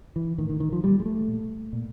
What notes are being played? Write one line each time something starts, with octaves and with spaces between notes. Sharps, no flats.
E3
A2 D#3
D#3
D#3
F3
A#2 G3
G#3
A3
A#2
A#2